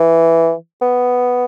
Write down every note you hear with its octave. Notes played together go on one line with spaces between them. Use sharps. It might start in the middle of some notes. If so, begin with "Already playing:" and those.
Already playing: E3
B3